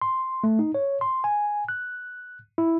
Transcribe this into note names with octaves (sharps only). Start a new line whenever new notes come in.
C6
A3
D#4
C#5
C6
G#5
F#6
E4